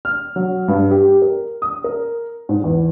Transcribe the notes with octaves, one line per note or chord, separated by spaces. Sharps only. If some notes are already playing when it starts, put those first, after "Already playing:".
F6
F#3
G2
G4
A#4
D#6
A#4
G#2
E2